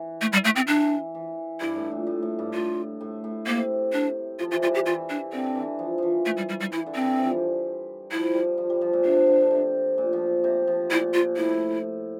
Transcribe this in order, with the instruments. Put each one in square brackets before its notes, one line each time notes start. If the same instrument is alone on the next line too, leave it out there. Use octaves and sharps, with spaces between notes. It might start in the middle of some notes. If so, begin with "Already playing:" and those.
Already playing: [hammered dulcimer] E3
[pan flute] A3
G3
A3
C4
[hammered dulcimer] E3 [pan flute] D4
[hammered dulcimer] E3
[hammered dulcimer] G2 [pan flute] E4
[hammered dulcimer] A2
A#2
A2
A2
G2
[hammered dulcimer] A2 [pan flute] F4
[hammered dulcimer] A2
A2
[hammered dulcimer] C3 [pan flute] A#3
[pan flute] D4
[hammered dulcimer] F3 [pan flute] F4
[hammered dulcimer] E3 [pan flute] F4
[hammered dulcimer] G3 [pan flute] F4
[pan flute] G4
[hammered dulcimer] E3 [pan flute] F4
[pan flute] D4
[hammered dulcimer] D3 [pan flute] C4
[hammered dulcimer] E3
F3
E3 F3
[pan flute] A3
G3
G3
G3
[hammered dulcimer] E3 [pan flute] E4
[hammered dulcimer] D3
[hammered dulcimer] E3 [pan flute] C4
[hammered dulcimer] F3
G3
[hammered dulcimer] F3 [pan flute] E4
[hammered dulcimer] G3
F3
G3
F3
A#2
[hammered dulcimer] C3 [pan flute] D4
[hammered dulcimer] D3
C3
A#2
F3
C3
F3
[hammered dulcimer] A#2 [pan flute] E4
[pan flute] F4
[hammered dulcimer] A2 [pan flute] E4